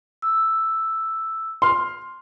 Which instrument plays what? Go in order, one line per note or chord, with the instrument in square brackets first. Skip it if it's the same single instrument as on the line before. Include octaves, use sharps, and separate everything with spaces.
[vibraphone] E6
[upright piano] C6 F6